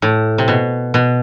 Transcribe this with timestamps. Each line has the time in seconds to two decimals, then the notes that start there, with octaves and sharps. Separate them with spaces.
0.02 A2
0.38 C3
0.48 B2
0.94 B2